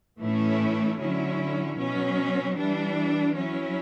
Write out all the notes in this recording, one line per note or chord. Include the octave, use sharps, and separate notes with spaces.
A2 E3 A3 C#4 E4
D3 F#3 C#4 E4
B2 F#3 C#4
E3 G3 D4
F#3 C#4 E4